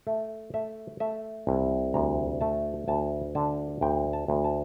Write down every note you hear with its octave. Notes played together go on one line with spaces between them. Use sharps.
A3
A3 E5
A3 E5
C2
D2 A#5
A3 A5
D2 A5
D3 A5
D2 G5
A5
D2
A5